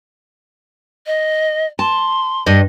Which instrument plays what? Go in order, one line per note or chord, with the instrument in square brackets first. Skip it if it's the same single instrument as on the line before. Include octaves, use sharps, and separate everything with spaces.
[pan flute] D#5
[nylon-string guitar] A5 [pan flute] C6
[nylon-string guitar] G2 D#5